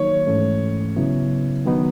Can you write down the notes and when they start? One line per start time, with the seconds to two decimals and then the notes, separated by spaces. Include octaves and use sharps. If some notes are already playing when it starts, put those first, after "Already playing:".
Already playing: D#3 F#3 A#3 D#4 C#5
0.27 G#2 E3 A3 C#4
0.96 C#3 F#3 B3 E4
1.66 D#3 F#3 B3 D#4